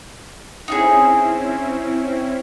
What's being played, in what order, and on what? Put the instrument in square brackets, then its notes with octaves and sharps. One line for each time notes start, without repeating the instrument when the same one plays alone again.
[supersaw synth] C4 C#4 E4 [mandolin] D#4 F#4 G#4